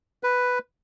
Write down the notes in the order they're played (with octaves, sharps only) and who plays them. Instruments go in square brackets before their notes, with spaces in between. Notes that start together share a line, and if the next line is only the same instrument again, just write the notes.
[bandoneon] B4